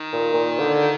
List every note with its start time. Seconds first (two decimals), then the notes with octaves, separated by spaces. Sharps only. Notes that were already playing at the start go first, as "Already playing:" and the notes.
Already playing: D#3
0.13 A#2
0.33 A#2
0.59 D3